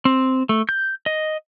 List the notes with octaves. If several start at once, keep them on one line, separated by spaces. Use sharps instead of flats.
C4
A3
G6
D#5